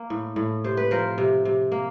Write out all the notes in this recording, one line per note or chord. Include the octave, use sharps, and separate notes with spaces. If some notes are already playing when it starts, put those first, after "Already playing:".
Already playing: A#3
A2
A2
C3 C5
B4
F3 A#4 C5
C3
C3
A#3